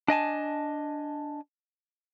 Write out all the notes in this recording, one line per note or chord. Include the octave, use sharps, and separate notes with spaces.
D4 D#5 G#5 A5